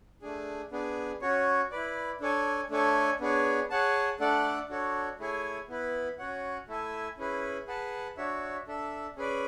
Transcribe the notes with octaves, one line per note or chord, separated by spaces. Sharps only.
A3 D4 G#4
B3 D4 G#4
C#4 F#4 C#5
E4 B4 D5
D4 A4 C#5 G#5
A3 D4 A4 C#5 G#5
B3 D4 G#4 C#5
G#4 C#5 F#5 A5
A3 D4 A4 D5 F#5
D4 F#4 A4 C#5
A3 E4 G#4 C#5 G#5
B3 E4 B4
C#4 F#4 C#5 F#5
A3 E4 A4 E5 G#5
C#4 E4 G#4 B4
G#4 B4 F#5 A5
D4 F#4 C#5 E5
D4 A4 E5
C#4 G#4 B4 D5